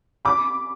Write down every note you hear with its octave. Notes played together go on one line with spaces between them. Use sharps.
B5 D6